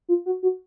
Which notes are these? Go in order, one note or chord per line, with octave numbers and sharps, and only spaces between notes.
F4
F#4
F#4